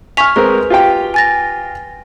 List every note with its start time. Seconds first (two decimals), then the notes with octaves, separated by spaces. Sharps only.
0.17 G#5 C#6 F6 B6 F7
0.36 G#3 C4 A#4 B4
0.70 F4 G4 G5
1.14 G#5 A6 A#6